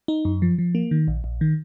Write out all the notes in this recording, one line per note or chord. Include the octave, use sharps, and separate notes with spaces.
D#4
F#2
F3
F3
A#3
D#3
A#1
A#1
D#3